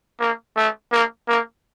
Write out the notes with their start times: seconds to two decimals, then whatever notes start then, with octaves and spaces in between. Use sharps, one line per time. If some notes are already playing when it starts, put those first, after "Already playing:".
0.20 A#3
0.57 A3
0.92 A#3
1.28 A#3